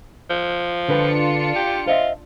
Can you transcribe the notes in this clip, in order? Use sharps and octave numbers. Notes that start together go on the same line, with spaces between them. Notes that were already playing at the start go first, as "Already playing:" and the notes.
F3
D3 D4 F4 B4 G5 C#7
G4
F4 C5 D#5 E5